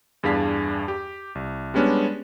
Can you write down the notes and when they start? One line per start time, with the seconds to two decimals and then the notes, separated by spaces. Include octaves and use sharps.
0.23 E2 G2 D4 G#4 F5 B6
0.88 G4
1.35 C2
1.74 G3 G#3 B3 C#4 D4 G4